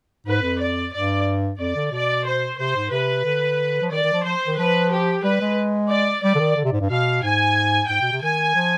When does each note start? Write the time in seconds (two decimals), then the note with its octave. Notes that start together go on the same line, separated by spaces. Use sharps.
0.26 G#2 B4
0.42 F2
0.59 D5
0.92 G2 D5
1.59 F2 D5
1.76 D3
1.92 B2 D5
2.26 C5
2.58 C3 C5
2.76 G#2
2.91 C3 B4
3.24 D3
3.82 F3
3.91 D#3 D5
4.03 D#3
4.13 F3
4.24 F3 C5
4.47 D#3
4.57 F3 B4
4.91 G4
5.24 G3 B4
5.41 G#3
5.90 D5
6.23 G3 D5
6.35 D3
6.39 D#3
6.56 D3
6.64 C3
6.72 G#2
6.81 G2
6.90 B2 F5
7.23 G#2 G#5
7.89 G#2 G5
8.01 B2
8.12 C3
8.22 D#3 G#5
8.55 F3